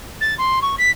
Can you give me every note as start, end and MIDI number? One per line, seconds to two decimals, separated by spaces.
0.21 0.35 93
0.38 0.59 84
0.62 0.75 85
0.78 0.91 95